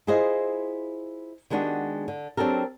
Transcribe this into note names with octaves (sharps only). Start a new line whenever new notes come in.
E4 F4 G#4 C5 D#5
D#3 G#3 B3 D4 F#4 G4
D3
F#3 C4 D4 G4 A4 A#4